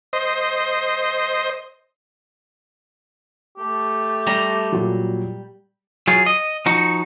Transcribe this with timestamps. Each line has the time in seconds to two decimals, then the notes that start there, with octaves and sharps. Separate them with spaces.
0.13 C5 D#5
3.58 A3 G4
4.27 G3 A#5
4.72 A#2 F#3
6.07 F#3 F4 G#4
6.26 D#5
6.66 F3 D#4 F#4